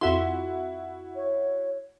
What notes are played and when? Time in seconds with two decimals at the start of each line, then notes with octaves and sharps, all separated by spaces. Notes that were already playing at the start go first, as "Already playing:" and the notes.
0.01 F2 E4 F#4 E5 C6
1.16 C#5